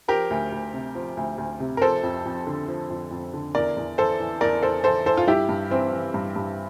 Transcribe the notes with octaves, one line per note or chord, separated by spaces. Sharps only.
F3 G4 A#4
D2
D2
C3
F3
D2
D2
C3
A#4
F3 A4 C5
F2
F2
D3
F3
F2
F2
D3
E2 A#4 D5
E2
E3 A4 C5
E3
E2 A#4 D5
E2 A4 C5
E3 A4 C5
E3 A4 C5
F4
G2 E4 G4
G2
E3 C4
E3
G2
G2